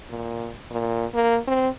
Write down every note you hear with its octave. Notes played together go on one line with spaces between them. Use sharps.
A#2
A#2
A#3
C4